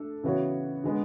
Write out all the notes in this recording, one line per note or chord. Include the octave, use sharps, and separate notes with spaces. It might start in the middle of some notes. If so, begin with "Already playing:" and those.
Already playing: A3 D4 A4
C#3 E3 B3 F#4 C#5
D3 G#3 B3